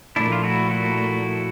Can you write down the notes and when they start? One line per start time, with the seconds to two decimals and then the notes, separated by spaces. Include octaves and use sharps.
0.16 A#2 F3 A3 D4 E4
0.32 F4
0.43 E4 F#4
0.71 E4 F#4